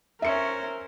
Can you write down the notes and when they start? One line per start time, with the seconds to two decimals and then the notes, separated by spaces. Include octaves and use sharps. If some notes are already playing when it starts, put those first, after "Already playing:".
0.22 C#4 A#4 C5 E5 C#7